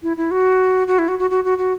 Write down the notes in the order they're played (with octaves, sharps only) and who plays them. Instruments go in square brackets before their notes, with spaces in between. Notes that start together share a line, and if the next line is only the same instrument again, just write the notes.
[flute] E4
E4
F#4
F#4
E4
F#4
F#4
F#4
F#4
F#4